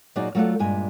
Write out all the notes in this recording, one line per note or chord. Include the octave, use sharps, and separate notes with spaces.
A#2 F#3 D#4 F#4 G#4 D5
F#3 A3 F4 A4 D5 F#5
G2 A#2 G#3 G#5